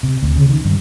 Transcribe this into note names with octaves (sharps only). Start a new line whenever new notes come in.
C3
D2
C#3
D#3
G2